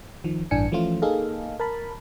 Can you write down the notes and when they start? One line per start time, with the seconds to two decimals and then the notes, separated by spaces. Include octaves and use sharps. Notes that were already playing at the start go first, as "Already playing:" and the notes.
0.24 D#3 F3
0.51 A1 G2 E3 D4 G#5 C#7
0.72 E3 F3 A3 C#4 F4
1.02 A#3 D#4 G#4 A4 F5
1.60 A#4 A5 B5